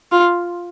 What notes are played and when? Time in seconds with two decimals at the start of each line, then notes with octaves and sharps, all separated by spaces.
0.12 F4